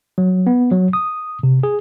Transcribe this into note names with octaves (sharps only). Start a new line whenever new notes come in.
F#3
B3
F#3
D#6
C3
G#4